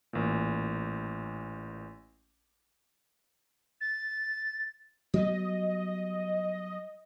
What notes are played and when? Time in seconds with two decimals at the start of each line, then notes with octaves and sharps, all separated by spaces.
0.13 A1 A#2
3.81 A6
5.14 F#3 G3 B3 D#5